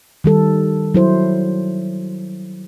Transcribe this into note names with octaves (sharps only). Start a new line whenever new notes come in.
D#3 G3 A4
F#3 E4 C5